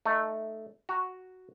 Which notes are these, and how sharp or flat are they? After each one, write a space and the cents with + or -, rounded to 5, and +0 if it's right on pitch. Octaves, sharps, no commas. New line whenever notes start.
A3 +0 D#4 -15
F#4 +0 A#5 +0